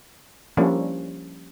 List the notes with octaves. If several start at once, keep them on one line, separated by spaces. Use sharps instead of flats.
F3 G3 A#3 C#4 D4 E4